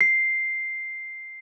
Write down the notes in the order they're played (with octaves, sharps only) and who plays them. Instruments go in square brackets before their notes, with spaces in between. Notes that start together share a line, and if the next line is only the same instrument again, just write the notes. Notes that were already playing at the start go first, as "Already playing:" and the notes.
[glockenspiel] C7